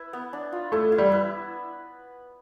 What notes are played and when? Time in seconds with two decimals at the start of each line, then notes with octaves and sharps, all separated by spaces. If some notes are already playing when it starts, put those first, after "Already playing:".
Already playing: E4 B4
0.13 B3
0.33 D4
0.52 F4
0.72 A3 E4
0.92 E4
0.98 G3
1.12 B4